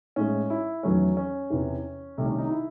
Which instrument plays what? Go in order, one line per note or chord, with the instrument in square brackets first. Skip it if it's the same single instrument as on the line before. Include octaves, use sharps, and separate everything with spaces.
[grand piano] A2 G#3 C#4
E4
E2 D#3 F#3 A3 C#4
C#4
E2 C3 E3
C2 C3 D#3 A3
C#4
D#4
E4